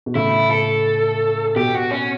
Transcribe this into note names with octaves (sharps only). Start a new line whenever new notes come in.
B2
A2 C#3 E4
A4
B2 G4
F#4
C#4